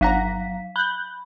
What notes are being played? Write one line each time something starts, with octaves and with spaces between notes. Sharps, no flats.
G1 F#3 F5 F#5 A#5 B6
B5 F#6 G6